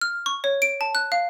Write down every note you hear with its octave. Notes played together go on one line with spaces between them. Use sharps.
F6
C#6
C#5
D7
A5
F#6
F5